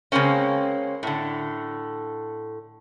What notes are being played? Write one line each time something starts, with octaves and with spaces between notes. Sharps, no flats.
C#3 G#3 A#3 C4 C#4
A2 D3